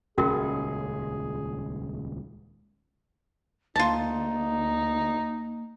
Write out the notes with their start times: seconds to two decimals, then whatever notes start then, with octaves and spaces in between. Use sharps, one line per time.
0.18 D#1 C#2 C#4 F#4 G#4 A#4
3.76 D2 A#3 D#4 F4 A5